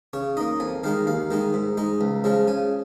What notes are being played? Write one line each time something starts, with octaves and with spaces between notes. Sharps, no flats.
C#3 C#5
A#3 D#4 D#5
F2 G#5
D#3 G#3 D#4 F5
D#2 F5
D#3 G#3 D#4
G#2
G#3 D#4
C#2
C#3 F3 G#3
C#3 G#5